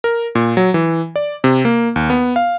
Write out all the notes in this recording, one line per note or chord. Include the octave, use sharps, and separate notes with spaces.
A#4
A#2
F#3
E3
D5
C3
A#3
D#2
B3
F5